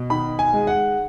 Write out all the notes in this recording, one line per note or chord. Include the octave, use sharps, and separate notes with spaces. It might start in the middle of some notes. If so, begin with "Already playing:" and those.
Already playing: B2
D#3 B5
G#5
G#3
F#5